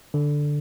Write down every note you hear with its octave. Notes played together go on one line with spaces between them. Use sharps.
D3